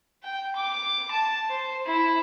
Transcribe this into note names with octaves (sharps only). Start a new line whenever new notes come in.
G5
D6
A5
C5
E4